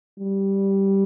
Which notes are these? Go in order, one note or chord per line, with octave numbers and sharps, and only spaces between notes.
G3